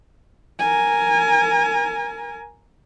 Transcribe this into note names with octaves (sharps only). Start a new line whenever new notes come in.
A#4 G#5